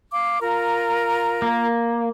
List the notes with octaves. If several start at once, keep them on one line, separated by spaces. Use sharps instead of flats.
F5 D6
F4 A#4 A#5
A#3